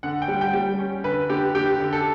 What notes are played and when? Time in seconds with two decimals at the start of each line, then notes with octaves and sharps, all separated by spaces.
0.03 D3 F#5
0.22 G5
0.28 G3
0.41 G5
0.53 G3
0.79 C#4
1.04 D3 B4
1.29 D3 G4
1.55 D3 G4
1.80 D3
1.93 A4